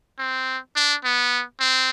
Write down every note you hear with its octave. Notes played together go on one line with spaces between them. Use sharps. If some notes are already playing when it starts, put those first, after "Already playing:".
C4
D4
B3
C4